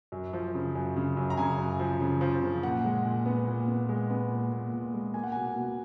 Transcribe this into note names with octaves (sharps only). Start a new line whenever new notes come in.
F#2
F3
C#3
F#2
C#3
F#2
A#5
C#3 G#5
F#2
F3
C#3
F3
C#3
A#2 F#5
G#3
A#2
B3
A#2
B3
G#3
B3
A#2
A#2
A#2
G#3
A#3 G#5
F#5
B2 G#5
B2